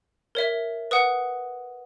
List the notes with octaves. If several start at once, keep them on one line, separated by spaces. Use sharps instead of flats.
A#4 C#5 E5
B4 F#5 D#6